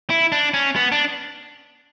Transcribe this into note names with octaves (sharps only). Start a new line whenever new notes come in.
E4
D4
C#4
B3
D4